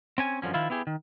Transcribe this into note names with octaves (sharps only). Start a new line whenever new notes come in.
C4 C#4 G#5
F#2 D3 F3 C#4
D#3 F3 E4 F4
B3 E4 G4 G#4
D#3